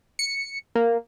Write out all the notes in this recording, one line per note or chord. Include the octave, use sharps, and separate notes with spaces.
C#7
A#3